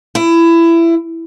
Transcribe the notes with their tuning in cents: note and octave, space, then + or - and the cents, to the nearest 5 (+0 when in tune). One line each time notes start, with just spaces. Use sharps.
E4 +20